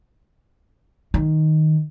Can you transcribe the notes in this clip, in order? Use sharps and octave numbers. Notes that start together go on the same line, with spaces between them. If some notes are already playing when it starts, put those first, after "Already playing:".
D#3